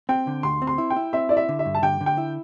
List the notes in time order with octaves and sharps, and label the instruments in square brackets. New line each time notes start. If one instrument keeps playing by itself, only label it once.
[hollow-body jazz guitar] C4 [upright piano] G5
[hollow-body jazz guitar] D3
[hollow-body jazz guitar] D2 [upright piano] C6
[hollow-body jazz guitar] C4
[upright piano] C6
[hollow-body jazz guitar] E4
[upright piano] G5
[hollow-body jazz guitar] E4
[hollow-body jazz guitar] C4 [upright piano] E5
[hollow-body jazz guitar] E4 [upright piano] D5
[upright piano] E5
[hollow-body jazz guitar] D3
[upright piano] E5
[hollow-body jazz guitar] G2
[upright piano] A5
[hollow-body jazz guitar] D3 [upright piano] G5
[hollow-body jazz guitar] D3
[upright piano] G5
[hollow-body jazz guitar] E4